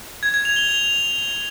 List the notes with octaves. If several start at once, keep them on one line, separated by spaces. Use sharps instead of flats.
G#6
G#6
F7
G7
F7